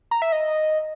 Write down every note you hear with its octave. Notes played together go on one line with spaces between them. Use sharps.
A#5
E5
D#5